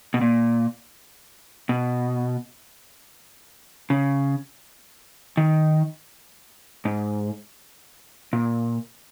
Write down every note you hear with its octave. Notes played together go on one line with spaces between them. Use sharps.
B2
A#2
B2
C#3
D#3
G#2
A#2